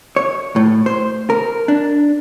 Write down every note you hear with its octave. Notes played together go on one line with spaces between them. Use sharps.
C#5
A2
C5
A#4
D4